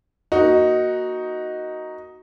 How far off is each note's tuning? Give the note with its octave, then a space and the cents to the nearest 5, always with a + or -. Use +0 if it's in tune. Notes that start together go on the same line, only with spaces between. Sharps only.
A#3 +0 D#4 +0 F#4 +0